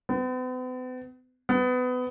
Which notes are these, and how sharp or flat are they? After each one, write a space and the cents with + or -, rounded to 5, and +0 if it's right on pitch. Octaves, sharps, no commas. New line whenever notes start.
B3 +45
B3 +25